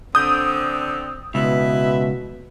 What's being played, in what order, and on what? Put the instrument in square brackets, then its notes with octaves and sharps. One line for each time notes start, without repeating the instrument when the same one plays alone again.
[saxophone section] D3 C4 [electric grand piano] D#6 G6
[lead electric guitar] C#2 [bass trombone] B2 [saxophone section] E4 B4 E5